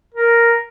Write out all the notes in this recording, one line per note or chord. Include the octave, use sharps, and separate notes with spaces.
A#4